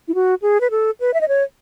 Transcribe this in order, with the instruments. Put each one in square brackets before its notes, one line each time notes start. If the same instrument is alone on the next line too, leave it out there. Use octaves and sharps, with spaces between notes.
[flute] E4
F#4
G#4
B4
A4
B4
E5
D#5
C#5